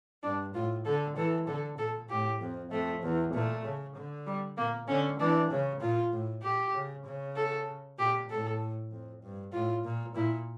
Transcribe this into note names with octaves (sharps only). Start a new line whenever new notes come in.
G2 D4
A2 F4
D3 A4
E3 A4
D3 A4
A#2 A4
A2 G4
F2
F2 A3
E2
A#2 A3
C#3
D3
G3
A#2 A#3
D3 C#4
E3 D4
C#3
A#2 F4
A2
A#2 G4
C#3
C#3
A4
A#2 G4
A2 A4
F2
G2
A2 F4
A#2
A#2 E4